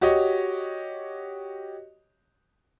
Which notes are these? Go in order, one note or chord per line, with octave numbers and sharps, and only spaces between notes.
F#4 G4 C#5 D#5